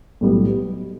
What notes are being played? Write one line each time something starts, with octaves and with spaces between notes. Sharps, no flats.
B1 A2 G3 B3